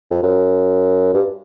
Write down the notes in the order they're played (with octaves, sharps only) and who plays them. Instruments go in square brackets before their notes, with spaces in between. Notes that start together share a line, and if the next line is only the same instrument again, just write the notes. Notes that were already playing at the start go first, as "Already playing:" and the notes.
[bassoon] F2
F#2
G2